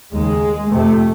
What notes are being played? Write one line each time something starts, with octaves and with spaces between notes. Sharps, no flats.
D#2 C#3 G#3
F2 C3 A3